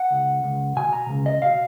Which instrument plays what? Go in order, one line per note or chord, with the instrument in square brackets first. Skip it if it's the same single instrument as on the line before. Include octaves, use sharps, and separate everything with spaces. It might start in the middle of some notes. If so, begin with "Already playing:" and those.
Already playing: [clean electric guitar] F#5
C#2
C#2
B2 G#5
A#5
C#2
D#5
B2 F5